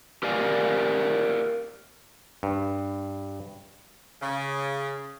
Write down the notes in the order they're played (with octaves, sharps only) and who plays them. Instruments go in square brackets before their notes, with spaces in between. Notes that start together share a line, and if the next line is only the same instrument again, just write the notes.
[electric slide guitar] G4 A#4 D5 F5 G#5
[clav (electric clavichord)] G2
[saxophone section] C#3